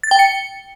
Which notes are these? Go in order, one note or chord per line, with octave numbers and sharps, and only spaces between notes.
A6
G5
C#7